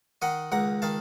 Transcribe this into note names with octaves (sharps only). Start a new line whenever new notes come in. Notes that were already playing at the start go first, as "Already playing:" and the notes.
D#3 D#5 F#5
C#2 F#5 A#5
D#3 F5 A5